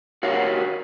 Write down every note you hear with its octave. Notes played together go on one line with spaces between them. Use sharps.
F#4 G4 A#4 C#5 F5 F#5